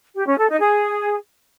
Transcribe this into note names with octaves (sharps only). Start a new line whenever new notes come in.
G4
C#4
A4
D#4
G#4